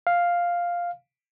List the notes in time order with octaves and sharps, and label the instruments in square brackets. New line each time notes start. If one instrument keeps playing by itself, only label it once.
[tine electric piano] F5